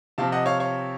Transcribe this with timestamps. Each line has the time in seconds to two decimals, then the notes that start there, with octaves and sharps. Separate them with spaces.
0.18 C3 F3 C4 F5 A5
0.32 D#5 F#5
0.46 C#5 F5
0.60 C#5 F5